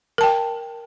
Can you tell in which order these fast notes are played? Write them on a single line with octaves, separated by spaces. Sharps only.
A#4 A5 G5